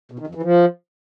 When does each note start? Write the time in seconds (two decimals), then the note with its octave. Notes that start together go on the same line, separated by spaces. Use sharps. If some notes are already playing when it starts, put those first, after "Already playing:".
0.12 B2
0.19 D#3
0.27 F2
0.35 E3
0.43 F3